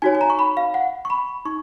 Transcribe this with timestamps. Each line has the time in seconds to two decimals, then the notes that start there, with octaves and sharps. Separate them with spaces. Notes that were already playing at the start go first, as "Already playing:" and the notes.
0.02 D#4 F#4 C#5 G#5
0.15 G#5
0.21 A#5
0.30 C#6
0.39 B5
0.57 F5
0.74 F#5
1.05 C#6
1.10 B5
1.45 D#4 C#6